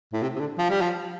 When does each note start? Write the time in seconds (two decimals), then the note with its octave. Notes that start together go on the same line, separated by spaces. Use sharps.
0.13 A2
0.22 C3
0.36 C3
0.40 D3
0.58 F3
0.70 G3
0.82 F3